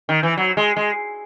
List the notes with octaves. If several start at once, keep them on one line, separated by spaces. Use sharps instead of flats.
D#3
E3
F#3
G#3
G#3